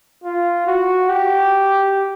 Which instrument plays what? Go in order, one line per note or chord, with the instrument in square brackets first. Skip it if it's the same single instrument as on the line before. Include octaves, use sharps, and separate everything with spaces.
[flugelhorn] F4
F#4
G4